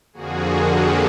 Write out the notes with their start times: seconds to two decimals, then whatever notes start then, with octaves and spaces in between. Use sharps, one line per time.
0.13 F2 D3 F3 A#3 F#4 G#4
0.64 G4 A4